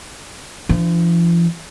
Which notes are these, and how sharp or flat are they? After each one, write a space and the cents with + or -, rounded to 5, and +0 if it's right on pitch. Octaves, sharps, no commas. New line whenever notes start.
F3 -45 D4 +0